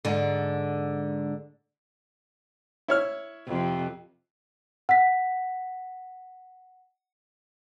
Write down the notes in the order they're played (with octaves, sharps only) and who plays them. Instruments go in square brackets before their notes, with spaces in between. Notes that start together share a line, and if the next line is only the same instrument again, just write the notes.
[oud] G#2 D3
[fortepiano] E4 C#5 F6
[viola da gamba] F2 C3
[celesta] F#5 B6